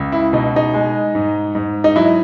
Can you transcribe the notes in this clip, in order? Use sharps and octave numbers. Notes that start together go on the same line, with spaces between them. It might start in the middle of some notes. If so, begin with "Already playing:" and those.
Already playing: C#2
E4
B2 D#4
D#4
G#3
G#2
G#2
D#4
F#3 E4